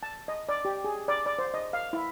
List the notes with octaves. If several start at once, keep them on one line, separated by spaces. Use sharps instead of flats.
A5
D#5
D5
G4
G#4
D5
D5
C5
D#5
F5
E4